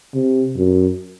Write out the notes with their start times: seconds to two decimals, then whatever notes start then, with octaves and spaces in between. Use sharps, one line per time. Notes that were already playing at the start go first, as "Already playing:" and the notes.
0.14 C3
0.57 F#2